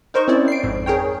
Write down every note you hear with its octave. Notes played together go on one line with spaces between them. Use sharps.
D#4 A#4 C5 D#5 C#6
C4 C#4 E4 D5
C7 D7
G#1 F2 G#2
G#4 A#4 C#5 G5